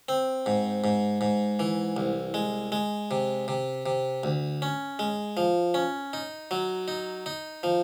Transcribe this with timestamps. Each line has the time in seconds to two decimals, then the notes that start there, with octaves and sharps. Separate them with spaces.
0.09 C4
0.46 G#2
0.84 G#2
1.21 G#2
1.59 E3
1.97 C2
2.34 G#3
2.72 G#3
3.11 C3
3.48 C3
3.86 C3
4.23 D2
4.62 C#4
4.99 G#3
5.37 F3
5.74 C#4
6.13 D#4
6.51 F#3
6.88 D#4
7.26 D#4
7.63 F3